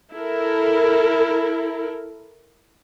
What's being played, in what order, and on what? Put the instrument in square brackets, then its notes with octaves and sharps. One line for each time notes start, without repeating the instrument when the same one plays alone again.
[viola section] E4 A4 A#4